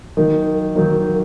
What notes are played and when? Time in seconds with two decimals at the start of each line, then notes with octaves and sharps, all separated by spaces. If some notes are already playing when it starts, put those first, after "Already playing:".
0.17 D#3 F#3 A#3 D#4
0.75 D#3 F#3 A#3 D#4